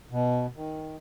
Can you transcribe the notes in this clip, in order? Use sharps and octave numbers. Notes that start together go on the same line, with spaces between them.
B2
D#3